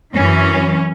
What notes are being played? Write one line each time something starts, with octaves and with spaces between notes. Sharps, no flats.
F#2 E3 C#4